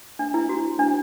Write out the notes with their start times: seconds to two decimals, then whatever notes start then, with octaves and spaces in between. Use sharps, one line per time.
0.19 D4
0.34 E4
0.49 F#4
0.79 D4